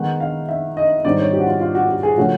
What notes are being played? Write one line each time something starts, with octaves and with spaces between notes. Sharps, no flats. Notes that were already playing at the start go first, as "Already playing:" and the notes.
Already playing: D#3 G#3 B3 D#4 F#5
F5
E5
D#5
G#2 D#3 G3 C4 D#4 D5
C#5
G4
F#4
F4
F4
F#4
G4
G#4
C#3 F3 A3 C#4 F#4